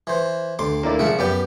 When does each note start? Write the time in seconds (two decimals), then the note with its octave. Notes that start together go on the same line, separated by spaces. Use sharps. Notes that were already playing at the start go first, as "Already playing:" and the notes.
0.07 E3 C5
0.59 D2 C6 D6
0.83 D2 A#3 E4 D5
0.99 C#3 F3 E5 F#5
1.19 F#2 B3 G4 D5 G5